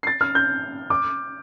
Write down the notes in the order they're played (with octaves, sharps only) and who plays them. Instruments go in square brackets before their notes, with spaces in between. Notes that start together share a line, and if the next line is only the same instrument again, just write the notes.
[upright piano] C7
A6
F6
G6
D6